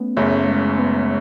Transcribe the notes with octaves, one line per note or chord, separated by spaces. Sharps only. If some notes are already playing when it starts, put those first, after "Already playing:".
Already playing: A3 B3 C#4
F#1 F#2 C#3 A3
A3
G#3
B3